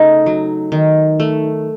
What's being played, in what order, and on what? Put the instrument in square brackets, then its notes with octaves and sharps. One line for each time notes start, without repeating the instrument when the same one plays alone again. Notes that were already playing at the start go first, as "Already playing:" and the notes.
Already playing: [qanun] C#3 A3 D#4
F#3
D#3
A3